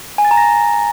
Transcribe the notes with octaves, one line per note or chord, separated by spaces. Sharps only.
G#5
A6
A#5
A#6